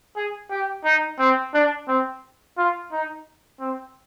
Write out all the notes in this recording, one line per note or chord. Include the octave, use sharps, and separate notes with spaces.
G#4
G4
D#4
C4
D4
C4
F4
D#4
C4